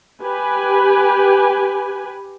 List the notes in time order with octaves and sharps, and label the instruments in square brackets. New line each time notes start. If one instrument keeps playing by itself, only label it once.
[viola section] G4 B4 G#5